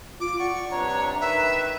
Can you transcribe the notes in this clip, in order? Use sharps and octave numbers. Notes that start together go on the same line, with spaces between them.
F4 D6
D5 F#5 C#6
G2 C3 D4 C#5 A#5
D#3 B4 E5